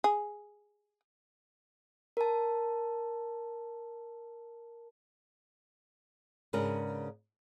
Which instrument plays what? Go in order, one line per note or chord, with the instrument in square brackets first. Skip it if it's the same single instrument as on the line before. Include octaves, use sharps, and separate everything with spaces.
[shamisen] G#4
[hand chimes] A#4 A5
[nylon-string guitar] G#2 C#3 D4 A#4 B4